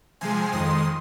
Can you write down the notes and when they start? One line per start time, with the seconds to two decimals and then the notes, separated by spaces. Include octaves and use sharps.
0.21 C3 F3 G#3 G#5 C6
0.52 F2 D#3 G#3 C6 D#6